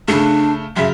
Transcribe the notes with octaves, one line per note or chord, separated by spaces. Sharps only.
C#3 A3 D4
F#2 C#3 E5